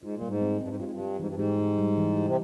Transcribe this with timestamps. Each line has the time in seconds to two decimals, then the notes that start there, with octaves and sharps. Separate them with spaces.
0.02 G#2 F4
0.15 A#2
0.22 G3
0.28 G#2
0.42 C4
0.61 G2 C4
0.68 G#2
0.76 G2
0.80 G#2 F4
0.92 G2
1.00 G3
1.19 G#2 E3
1.27 G2
1.34 G#2 G4
1.59 G4
1.78 G3
1.98 E3
2.17 G4
2.26 C3